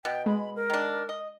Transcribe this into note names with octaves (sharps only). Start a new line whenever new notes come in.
B2 G5
G#3 B5
A#4
D#3 D4
D#5